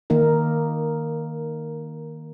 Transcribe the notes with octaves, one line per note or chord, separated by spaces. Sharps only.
D#3 A#3 D#4 A#4